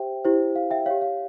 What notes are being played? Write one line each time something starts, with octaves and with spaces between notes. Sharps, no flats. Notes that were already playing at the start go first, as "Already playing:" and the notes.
Already playing: G4 C5 E5 G5
E4 G4 C5
F5
E5 G5
G4 C#5 F5
F5